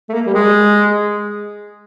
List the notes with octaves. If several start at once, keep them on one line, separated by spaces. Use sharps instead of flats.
A3
A#3
G3
G#3